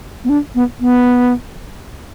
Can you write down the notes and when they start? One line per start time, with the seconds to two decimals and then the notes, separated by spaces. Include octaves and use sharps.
0.24 B3
0.29 D4
0.55 B3
0.80 B3